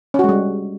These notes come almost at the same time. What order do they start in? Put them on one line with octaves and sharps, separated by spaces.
C#4 F#4 G#3 G3